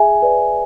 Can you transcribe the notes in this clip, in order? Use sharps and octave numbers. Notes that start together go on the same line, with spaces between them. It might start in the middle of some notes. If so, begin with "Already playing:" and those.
Already playing: G#4 E5 G#5
B4 D5